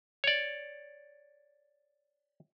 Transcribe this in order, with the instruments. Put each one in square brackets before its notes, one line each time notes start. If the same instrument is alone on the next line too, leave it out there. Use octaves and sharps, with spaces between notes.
[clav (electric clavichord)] C#5 D5